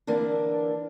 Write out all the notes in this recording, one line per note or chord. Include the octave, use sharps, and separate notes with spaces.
D3 E3 A#3 D4